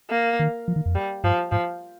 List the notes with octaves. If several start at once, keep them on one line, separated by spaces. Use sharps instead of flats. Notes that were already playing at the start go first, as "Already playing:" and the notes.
A#3
D#3
F3
D#3
F2
G3
G2 F3
G#2 F3